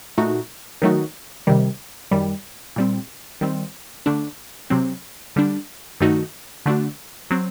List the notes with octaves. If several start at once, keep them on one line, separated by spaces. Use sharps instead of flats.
A#2 A3 D#4 F#4
D#3 F#3 A3 D#4 F#4
C3 D#3 G3
F#2 D#3 G3
A#2 G3 C4
D#3 G3 C4
D3 A3 D4
C3 F#3 C4
D3 G3 D4
G2 D#3 A3 D#4 F#4
D3 A3 D4 F#4
F#3 C4